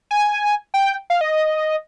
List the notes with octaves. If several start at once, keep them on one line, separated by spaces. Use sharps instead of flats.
G#5
G5
F5
D#5